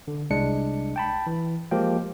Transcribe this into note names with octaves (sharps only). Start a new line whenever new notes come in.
D3
C2 G#3 D4 C#7
G5 A5 B5
E3
F3 G#3 A#3 G4 G5